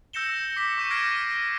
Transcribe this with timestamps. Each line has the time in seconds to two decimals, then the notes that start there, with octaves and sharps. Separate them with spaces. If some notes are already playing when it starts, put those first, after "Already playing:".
0.13 E6 G6 A#6 C#7 E7 G7
0.56 D6 B6 C#7
0.78 C#6 G6 D#7
0.91 F6 G#6 A#6 C7 D7